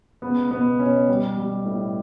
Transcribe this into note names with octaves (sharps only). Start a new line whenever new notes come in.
C#2 B3
B2 B3
B2 C#4
G3
G3
A2